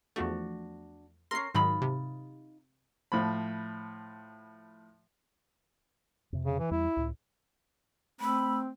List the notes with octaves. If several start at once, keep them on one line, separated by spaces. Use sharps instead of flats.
E2 F3 A3 D4 F#4
C#4 D#4 A#4 C6 C7
G#2 D#3 F#3 D#4 F4 B5
C3
A2 F3 B5
F2 C3
C#3
E3
E2 G3 E4
C#2 A2
A3 C4 B5 E6